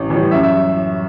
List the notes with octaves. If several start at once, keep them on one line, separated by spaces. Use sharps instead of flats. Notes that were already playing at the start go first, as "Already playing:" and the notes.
Already playing: A1
A2 E3 G3
F#2 E5
E5